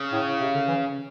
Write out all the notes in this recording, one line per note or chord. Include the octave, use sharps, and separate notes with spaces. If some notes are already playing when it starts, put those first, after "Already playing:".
Already playing: C#3
A2
C3
D3
E3